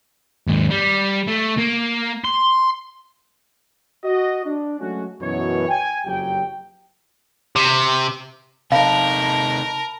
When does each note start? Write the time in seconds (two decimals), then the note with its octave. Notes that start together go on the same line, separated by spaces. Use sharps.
0.47 D#2 G#2
0.71 G3
1.28 A3
1.58 A#3
2.25 C6
4.04 F#4 D#5
4.46 D4
4.79 F#3 G#3 A3 C#4 F#4
5.21 F#2 B2 E3 C#5
5.69 G5 G#5
6.06 F#1 F2 F#3 G4 G5
7.56 C3
8.72 C3 D#4 A#4 F5 A5 B5